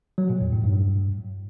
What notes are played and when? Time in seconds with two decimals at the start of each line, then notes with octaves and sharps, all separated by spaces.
0.18 F#3
0.29 A#2
0.41 E2
0.52 A2
0.64 G2